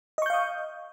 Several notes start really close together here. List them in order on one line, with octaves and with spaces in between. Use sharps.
D#5 C#6 G6 F5 D#6